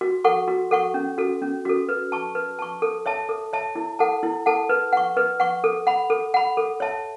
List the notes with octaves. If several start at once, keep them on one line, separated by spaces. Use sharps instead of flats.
F#4
A4 F#5 C#6
F#4
A4 F#5 C#6
C#4
F#4 A4
C#4
F#4 A4
B4
A5 C#6
B4
A5 C#6
A4
C#5 E5 A5
A4
C#5 E5 A5
E4
A4 F#5 A5
E4
A4 F#5 A5
B4
F#5 C#6
B4
F#5 C#6
A4
F#5 B5
A4
F#5 B5
A4
C#5 E5 A5